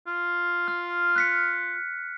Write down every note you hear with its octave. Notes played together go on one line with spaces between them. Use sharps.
F4
F6
F#6 B6 C#7